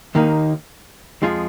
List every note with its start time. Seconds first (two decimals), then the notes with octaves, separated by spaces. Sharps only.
0.15 D#2 D#3 A#3 D#4
1.22 F2 F3 G#3 F4 G#4